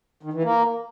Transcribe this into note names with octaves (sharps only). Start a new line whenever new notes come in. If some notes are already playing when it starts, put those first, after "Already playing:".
D#3
E3
A#3